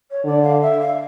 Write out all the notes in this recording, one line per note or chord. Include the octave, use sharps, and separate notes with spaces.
C#5
D3 D5
F5
E5
F5